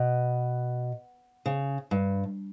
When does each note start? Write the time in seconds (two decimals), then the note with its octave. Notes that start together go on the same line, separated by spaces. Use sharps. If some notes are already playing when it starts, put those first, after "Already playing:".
Already playing: B2
1.46 C#3
1.91 G2